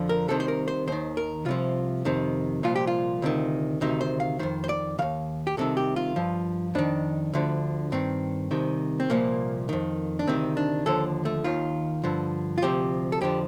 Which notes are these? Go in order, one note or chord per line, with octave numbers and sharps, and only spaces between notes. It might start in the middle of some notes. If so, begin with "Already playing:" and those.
Already playing: F2 D3 F3
A#4
C2 C3 D#3 A4
C5
A#4
C5
D#2 D#3 C5
A#4
C2 C3 F3 F4
F2 C3 D#3
C2 A#2 F3 F4
G4
F4
D2 C3 D#3
D2 C3 D#3 D#4
C5
F5
F2 D#3 C5
C5
D5
D#2 D#3 F5
G4
C2 C3 D#3 A4
G4
F4
G2 F3
F2 D#3 D4
D2 D3 F3
G2 D#3 C4
C2 C3 D#3
C4
C2 A#2 F3 A#3
F2 D#3
D4
D2 C3 D#3 C4
D4
D#2 D3 F3 A4
A3
D#2 D#3 F4
G2 D3 F3
F4
D2 C3 F3 G4
A4
F2 D3 F3 G4